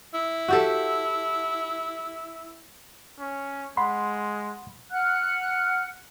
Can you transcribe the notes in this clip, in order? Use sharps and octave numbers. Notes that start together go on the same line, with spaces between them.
E4
F#4 G4 A4
C#4
G#3 F#5 B5 C6
F#5 F6 F#6